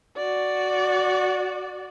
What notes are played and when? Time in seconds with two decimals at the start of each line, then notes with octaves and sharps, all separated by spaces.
0.17 F#4 D5